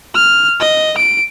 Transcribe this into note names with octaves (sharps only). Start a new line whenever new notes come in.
F6
D#5
D7